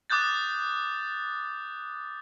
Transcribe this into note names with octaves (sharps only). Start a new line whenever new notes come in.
D6 D#6 F#6 G6 A6